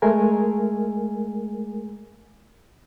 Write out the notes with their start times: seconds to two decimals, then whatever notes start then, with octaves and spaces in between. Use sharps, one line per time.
0.02 G#3 A3 G#4 A#4 G#5